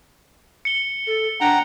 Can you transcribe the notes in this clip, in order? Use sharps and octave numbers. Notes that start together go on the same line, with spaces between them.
C#7 G7
A4
D4 F#5 G5 A#5